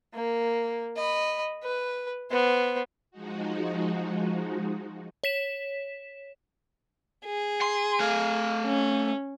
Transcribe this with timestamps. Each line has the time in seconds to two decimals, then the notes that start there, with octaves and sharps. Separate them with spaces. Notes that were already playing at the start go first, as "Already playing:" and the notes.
0.14 A#3
0.96 D#5 B5
1.63 B4
2.30 B3 C5
3.11 F3 G#3 D#4 F#4
5.24 C#5 B6 E7
7.25 G#4
7.62 C6
8.00 A3 F5
8.66 C#4